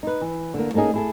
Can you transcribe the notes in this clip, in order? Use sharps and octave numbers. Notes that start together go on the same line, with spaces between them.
D#4 B4
E3
D3 A#3
A3 A#3 C#4 D#4 G#4
E4 G#4 A4